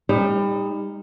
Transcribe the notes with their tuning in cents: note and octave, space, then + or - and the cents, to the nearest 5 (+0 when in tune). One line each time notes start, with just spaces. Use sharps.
G3 +30 D#4 +0